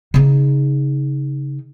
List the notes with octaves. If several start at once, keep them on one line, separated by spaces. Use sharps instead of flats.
C#3 D#4